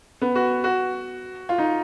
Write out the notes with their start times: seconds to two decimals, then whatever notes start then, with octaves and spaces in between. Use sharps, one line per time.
0.22 B3
0.35 F#4
0.64 F#4
1.49 F4
1.58 D#4